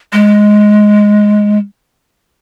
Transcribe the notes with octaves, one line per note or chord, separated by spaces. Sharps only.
G#3